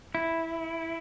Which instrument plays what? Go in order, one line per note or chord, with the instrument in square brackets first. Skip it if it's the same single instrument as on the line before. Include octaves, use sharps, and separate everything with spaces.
[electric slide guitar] E4